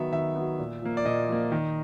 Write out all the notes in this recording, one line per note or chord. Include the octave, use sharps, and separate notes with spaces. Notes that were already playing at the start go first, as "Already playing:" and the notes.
Already playing: D#3 F#3 B3 E5
D#3 E5
F#3 B3
A#2
F3 A#3
D5
A#2 D#5
F3 A#3
D#3